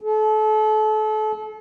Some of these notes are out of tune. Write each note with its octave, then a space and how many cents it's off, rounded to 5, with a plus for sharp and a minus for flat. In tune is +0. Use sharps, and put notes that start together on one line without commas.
A4 -35